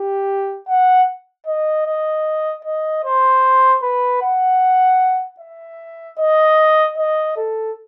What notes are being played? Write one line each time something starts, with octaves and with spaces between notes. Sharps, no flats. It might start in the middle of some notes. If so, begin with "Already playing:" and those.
Already playing: G4
F#5
D#5
D#5
D#5
C5
B4
F#5
E5
D#5
D#5
A4